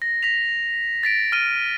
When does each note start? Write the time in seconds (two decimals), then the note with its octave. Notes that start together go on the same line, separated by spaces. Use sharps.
0.02 A#6
0.23 A#6 B6 F7
1.03 A6 B6 D7
1.32 F6 D#7